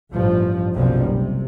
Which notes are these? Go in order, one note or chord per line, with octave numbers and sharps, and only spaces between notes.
A1 G2 F3
F#1 B1 F#2 C3 F3 G3
C3